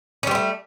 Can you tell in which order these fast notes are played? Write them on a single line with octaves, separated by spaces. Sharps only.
C#4 G3 C4 A3